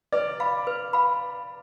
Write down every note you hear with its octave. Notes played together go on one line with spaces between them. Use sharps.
B4 D5 D6
F5 B5
B4
F5 B5